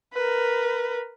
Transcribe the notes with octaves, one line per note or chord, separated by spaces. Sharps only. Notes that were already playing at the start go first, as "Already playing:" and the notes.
A#4 B4